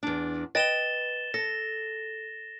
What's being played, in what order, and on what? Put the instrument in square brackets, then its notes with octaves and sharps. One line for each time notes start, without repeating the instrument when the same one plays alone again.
[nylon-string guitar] E2 D4
[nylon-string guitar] B4 D#5 G5 [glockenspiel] A6 E7 G7
[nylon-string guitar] A4 [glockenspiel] A#6